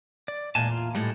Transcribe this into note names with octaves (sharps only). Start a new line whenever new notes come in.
D5
E2 A#2 G#3 G#5 A5
F4
A2 G3 G#3 A4